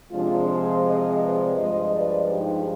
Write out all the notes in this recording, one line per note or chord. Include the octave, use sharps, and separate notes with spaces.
C3 F3 G#3 D4 F4
G#4 C5
C5 D#5
B4 D5
G2 F3 G#3 C5 D#5
B4 D5
D#4 G4